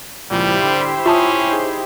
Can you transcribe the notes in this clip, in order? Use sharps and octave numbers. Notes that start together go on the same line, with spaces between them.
C#2 A#2 F3 G3 E4 G4 C5
D3
C#4 F4 E5 A5 D#6
D#4 G#4